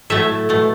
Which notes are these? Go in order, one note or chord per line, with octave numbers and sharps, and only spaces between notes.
A2 F#3 A3 E5
B2 A3